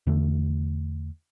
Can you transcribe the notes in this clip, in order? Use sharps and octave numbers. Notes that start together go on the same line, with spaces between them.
E2 D3 A3